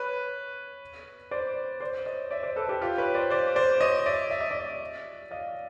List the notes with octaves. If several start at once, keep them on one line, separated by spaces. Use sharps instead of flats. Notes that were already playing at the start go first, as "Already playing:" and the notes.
Already playing: B4 C#5
C5 D5
C5 D5
C#5 D#5
D5 E5
C5 D5
A4 B4
G4 A4
F4 G4
B4 C#5
C5 D5
C5 D5
C5 D5
C#5 D#5
D5 E5
E5
D#5
D5 E5
D#5 F5